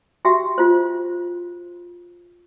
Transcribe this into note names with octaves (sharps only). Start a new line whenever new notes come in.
F#4 G4 E5 G5
F4 C5